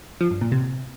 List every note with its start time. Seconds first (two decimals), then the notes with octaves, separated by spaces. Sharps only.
0.21 F3
0.31 G2
0.41 A#2
0.52 C3